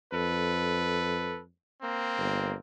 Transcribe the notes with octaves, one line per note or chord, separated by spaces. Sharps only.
F2 A4 B4
A#3 C4
G1